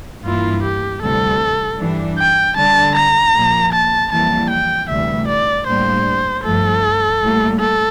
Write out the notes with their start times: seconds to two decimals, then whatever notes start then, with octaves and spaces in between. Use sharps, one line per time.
0.24 G2 E3 A#3 E4 F4
0.63 G4
1.02 D2 C3 E3 G3 A4
1.79 G2 E3 G3 D4
2.18 G5
2.57 D3 G3 D4 A5
2.95 A#5
3.35 A#2 F3 A#3
3.73 A5
4.11 F2 E3 G3 A#3 A5
4.50 G5
4.89 D2 C3 E3 G3 E5
5.28 D5
5.66 A2 G3 A#3 D4 C5
6.44 G2 F3 A3 A4
7.21 A2 G3 A#3
7.60 A4